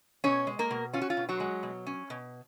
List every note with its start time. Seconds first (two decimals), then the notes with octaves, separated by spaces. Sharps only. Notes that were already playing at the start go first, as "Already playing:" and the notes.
0.24 B2 C#4 C#5
0.47 G#3
0.59 A#3 A#4
0.71 B2
0.93 C#4 F4
1.01 F#4
1.10 F4
1.17 B2
1.29 F#3 F#4
1.40 G#3
1.63 B2
1.87 C#4
2.10 B2